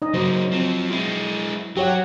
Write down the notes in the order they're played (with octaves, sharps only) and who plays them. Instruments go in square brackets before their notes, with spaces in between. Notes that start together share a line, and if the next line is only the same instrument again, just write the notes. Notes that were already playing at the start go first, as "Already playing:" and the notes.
[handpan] D#4 D#5
[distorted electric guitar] C#3 A#3 [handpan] F#3 C5
[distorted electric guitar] F3 C4
G#3 E4
[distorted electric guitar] F#3 [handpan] G4 C#5 F#5